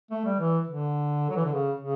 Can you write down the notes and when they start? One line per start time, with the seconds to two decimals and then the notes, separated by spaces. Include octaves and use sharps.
0.11 A3
0.25 G3
0.40 E3
0.68 D3
1.30 F#3
1.36 E3
1.45 D3
1.53 C#3
1.81 C#3